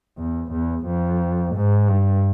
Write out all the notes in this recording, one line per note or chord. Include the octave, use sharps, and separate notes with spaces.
E2
E2
F2
G#2
G2